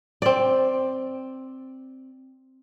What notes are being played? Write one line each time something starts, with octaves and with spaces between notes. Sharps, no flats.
C4 D5